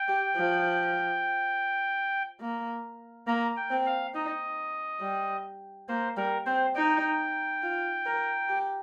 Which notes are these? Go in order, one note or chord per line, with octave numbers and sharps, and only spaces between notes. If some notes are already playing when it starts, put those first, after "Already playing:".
Already playing: G5
G4
F3
A#3
A#3 A#5
G5
C4
F5
D#4 D#5
G3
A#3 C5
G3 A#4
C4 C5
D#4 G5
F4
A#4
G4